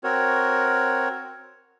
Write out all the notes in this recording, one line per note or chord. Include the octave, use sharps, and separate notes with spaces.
C4 F#4 A#4 C#5